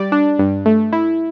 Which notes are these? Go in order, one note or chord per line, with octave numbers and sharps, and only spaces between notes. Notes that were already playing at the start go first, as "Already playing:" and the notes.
Already playing: G3 D5
D4
G2
A3
E4